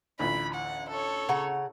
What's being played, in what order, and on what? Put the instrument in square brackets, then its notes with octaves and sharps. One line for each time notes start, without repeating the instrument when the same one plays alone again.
[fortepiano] A1 D2 F4 [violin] B5
[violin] F#5
A4 C#5
[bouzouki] C#3 F#5 A#5